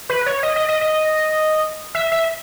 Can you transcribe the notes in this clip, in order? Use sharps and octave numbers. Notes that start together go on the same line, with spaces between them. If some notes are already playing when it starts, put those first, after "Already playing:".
B4
C#5
D#5
D#5
D#5
D#5
E5
E5